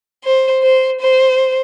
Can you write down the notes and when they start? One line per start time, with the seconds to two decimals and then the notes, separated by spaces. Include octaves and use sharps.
0.24 C5
0.63 C5
1.01 C5